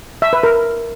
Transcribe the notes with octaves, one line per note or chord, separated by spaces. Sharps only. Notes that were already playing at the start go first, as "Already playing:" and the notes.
E5
B4
A#4